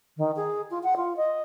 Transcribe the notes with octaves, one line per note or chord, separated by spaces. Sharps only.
D#3
G#4
F4
F#5
F4
D#5